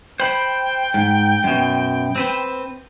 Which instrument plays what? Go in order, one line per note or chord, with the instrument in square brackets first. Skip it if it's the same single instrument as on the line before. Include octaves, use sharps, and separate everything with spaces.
[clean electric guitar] C5 B5 [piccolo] G5
[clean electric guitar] G#2
F#2 B2
C4 B4 C5